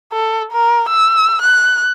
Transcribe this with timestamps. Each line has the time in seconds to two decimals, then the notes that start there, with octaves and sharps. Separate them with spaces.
0.13 A4
0.52 A#4
0.89 E6
1.41 F#6